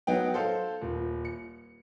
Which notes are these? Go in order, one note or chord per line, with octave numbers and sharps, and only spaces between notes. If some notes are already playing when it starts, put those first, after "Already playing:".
F#3 B3 D#4 G5
A4 C5 F5
D#1
C#7